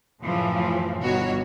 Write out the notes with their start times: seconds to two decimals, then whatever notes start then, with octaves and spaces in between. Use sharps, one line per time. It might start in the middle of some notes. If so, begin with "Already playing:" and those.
0.22 F#2 A2 C#3 E3 F3
1.01 G1 G2 B2 D#3 F#4 C#5